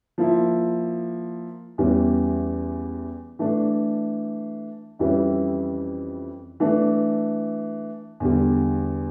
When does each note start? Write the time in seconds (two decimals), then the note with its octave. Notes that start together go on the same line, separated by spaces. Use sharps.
0.18 F3 A#3 E4
1.78 E2 E3 G3 C#4
3.39 E3 A3 D4
4.99 F2 E3 G3 C#4 E4
6.60 E3 A3 D4
8.20 E2 D3 G3